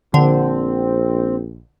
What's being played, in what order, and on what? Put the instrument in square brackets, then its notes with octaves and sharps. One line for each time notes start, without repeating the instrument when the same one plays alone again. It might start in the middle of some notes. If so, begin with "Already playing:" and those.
[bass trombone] A#1 [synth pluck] D3 [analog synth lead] C4